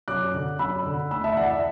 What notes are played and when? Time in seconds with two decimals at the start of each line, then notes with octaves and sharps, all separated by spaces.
0.08 F#2 D6 F#6
0.34 D3
0.59 F#2 B5 E6
0.86 D3
1.11 A2 B5 E6
1.24 E5 A5
1.37 E3 D5 F#5
1.50 E5